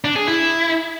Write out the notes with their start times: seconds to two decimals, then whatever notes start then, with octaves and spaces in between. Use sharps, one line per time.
0.04 D4
0.16 G#4
0.27 E4